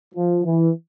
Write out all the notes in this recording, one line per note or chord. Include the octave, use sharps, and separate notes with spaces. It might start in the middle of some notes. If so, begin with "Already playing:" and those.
F3
E3